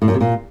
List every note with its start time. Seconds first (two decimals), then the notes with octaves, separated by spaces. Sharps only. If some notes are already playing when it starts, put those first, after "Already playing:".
0.02 A2
0.08 F#2
0.14 C3
0.21 A#2